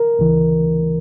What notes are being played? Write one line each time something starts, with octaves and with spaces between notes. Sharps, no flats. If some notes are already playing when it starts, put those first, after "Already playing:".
Already playing: A#4
D2 C#3 E3